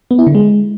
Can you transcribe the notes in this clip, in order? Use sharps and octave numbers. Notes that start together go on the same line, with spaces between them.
B3
E4
D3
G#3